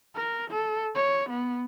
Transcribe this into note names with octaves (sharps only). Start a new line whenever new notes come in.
A#4
A4
C#5
B3